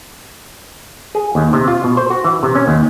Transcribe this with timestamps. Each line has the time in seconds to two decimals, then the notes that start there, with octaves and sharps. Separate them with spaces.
1.15 G#4
1.35 D#2
1.53 C3
1.68 F4
1.84 B2
1.97 C5
2.10 F#4
2.25 E3
2.43 C3
2.55 C#4
2.68 D#2